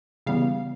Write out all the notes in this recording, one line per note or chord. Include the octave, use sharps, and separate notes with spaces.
C#3 E3 G3 B3 F5